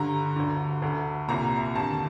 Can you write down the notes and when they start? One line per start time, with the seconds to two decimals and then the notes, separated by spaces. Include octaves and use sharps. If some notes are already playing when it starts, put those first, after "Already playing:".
Already playing: G2 D3 A#5
0.36 D2 D3
0.82 D2 D3
1.28 C2 A#2 A#5
1.75 D#2 D3 A5